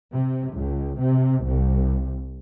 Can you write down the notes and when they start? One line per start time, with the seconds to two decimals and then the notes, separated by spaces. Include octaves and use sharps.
0.12 C3
0.53 C#2
1.00 C3
1.45 C2